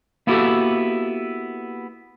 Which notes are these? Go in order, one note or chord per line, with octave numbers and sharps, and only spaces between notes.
A#3 B3 E4 F#4 G4 A4